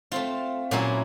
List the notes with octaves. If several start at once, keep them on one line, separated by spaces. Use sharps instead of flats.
A3 C4 F4
A#2 F#3 A#3 C#4 E4